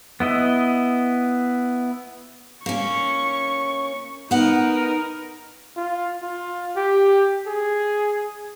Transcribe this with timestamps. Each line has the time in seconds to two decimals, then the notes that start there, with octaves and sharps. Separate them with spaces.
0.20 B3 E4 D#5
2.66 A#3 C#4 C#6
4.31 B3 D#4 A#4 F#5
5.76 F4
6.23 F4
6.76 G4
7.47 G#4